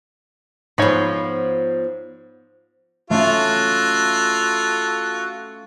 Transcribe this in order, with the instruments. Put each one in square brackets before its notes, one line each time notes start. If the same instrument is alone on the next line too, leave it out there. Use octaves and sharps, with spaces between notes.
[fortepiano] G#2 C#5 [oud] F3 B3
[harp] A3 C#4 [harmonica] F4 F#4 A4